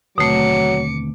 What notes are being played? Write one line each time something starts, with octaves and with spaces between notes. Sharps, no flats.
D#2 B2 D3 F#3 A3 C4 D6 C#7